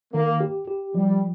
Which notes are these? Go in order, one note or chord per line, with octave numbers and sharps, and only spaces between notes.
D#3 A#3
G4
G4
F3 G3